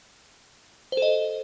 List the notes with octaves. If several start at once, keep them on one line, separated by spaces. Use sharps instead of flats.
A4 C5 D#5